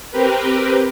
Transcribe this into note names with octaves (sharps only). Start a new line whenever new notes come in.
C4 G4 A#4 B4